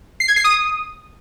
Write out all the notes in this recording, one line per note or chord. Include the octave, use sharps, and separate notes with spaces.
C7
G#6
C7
D#6